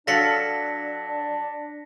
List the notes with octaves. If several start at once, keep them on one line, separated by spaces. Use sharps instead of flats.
F#3 D4 A4 F5 A#6 B6 C#7